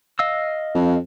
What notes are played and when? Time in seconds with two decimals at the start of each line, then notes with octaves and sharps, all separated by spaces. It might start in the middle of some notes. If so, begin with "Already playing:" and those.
0.19 D#5 F5 E6
0.75 F2